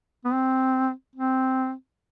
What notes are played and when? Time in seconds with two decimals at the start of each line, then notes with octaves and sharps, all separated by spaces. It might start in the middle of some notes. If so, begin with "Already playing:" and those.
0.25 B3
0.33 C4
1.15 C4